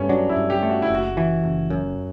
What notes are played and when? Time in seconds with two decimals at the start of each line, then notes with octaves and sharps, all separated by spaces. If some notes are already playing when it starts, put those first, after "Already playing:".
Already playing: G2 A3 B3 C#4
0.09 F#3 D4
0.29 E4
0.36 G2
0.50 G4
0.63 A3
0.70 F#4
0.82 E4
0.90 F#1 F#4
1.17 E3
1.44 F#1
1.70 F#2